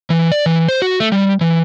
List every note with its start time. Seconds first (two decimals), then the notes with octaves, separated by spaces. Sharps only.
0.10 E3
0.32 D5
0.46 E3
0.68 C5
0.82 F#4
1.00 A3
1.12 G3
1.41 E3